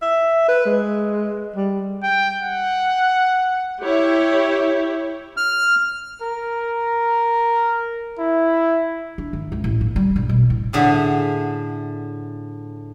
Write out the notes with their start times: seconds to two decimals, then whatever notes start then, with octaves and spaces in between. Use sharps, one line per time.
0.02 E5
0.48 B4
0.66 G#3
1.56 G3
2.03 G5
2.42 F#5
3.83 E4 G4 C#5
5.37 F6
6.22 A#4
8.19 E4
9.18 D4
9.33 D#3
9.52 C#2
9.64 A1
9.81 A#3
9.96 G3
10.16 A#1
10.29 B2
10.50 A2
10.73 A2 D3 G#4 E5